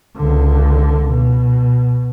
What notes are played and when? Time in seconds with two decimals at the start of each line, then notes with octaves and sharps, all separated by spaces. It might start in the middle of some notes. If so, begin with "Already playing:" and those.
0.17 C#2 D3
1.09 B2